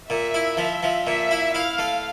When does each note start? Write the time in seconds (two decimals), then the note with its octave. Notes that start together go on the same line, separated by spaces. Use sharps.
0.10 A#2 E5
0.34 E4
0.57 F3
0.83 F3
1.06 A#2 E5
1.31 E4
1.55 E4 F5
1.79 A3